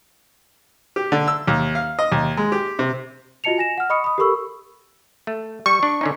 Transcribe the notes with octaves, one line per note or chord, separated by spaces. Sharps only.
G4
D3
E6
D#2
F5
D#5
D#2
G#3
G4
C3
F4 F#4 D#5 A5 C#7 F7
G#5 A#6 E7
F#5 F6
D#5 B5 C#6 D#6 C#7
B5 D#6
G4 A4 A#4 B5 C#6 E6
A3
G3 C#6
D4
D3 C#4 D#4